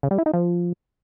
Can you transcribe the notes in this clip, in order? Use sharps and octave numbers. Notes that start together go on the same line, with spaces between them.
C#3
G3
E4
D#4
F3